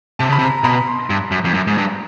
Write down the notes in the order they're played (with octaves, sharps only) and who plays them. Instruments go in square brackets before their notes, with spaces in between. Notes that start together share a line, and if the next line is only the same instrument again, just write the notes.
[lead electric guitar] C3 [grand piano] A5
[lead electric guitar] C#3 [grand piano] B5
[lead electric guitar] C3
[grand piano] A#5
A#5
[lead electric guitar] B2 [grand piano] B5
[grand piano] C6
[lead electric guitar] G2
F#2
F2
F#2
G#2
G2